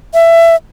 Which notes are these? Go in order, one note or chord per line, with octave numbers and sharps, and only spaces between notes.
E5